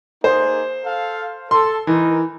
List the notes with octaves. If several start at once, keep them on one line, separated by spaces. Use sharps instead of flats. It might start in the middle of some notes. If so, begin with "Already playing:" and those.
A#3 D#4 G#4 C5
A4 F5
A4 C6
E3 D#4 A#4